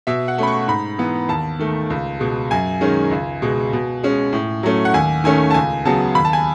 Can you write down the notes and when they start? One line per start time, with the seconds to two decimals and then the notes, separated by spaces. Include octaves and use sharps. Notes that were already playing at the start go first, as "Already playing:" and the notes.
0.07 B2 E5
0.28 F#5
0.38 A3 C#4 B5
0.47 C#6
0.68 G#2 B5
0.99 E3 B3
1.28 D#2 A5
1.59 D#3 A3
1.90 C#2
2.20 B2 G#3
2.51 F#2 G#5
2.81 D#3 G#3 C#4
3.11 C#2
3.42 B2 G#3
3.73 B2
4.03 G#3 C#4
4.33 A2
4.63 F#3 A3 C#4
4.85 F#5
4.94 D#2 G#5
5.24 D#3 A3 C#4 G#5
5.51 A5
5.54 C#2 G#5
5.85 C#3 F#3 B3 A5
6.15 D#2 B5
6.25 A5
6.33 G#5